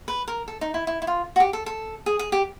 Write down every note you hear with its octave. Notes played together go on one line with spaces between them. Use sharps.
B4
A#4
A4
D#4
E4
E4
E4
F4
F#4
G4
A4
A4
G#4
G#4
G4